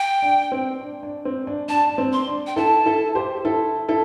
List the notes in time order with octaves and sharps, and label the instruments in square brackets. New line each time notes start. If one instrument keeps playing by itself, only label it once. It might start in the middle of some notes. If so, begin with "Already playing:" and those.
Already playing: [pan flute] G5
[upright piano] D4
C4
D4
D4
C4
D4
[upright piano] D4 [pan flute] A5
[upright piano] D4
C4
[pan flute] C6
[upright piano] D4
[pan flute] G5
[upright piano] E4 A4 [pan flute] A5
[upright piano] E4 A4
G4 C5
E4 A4
E4 A4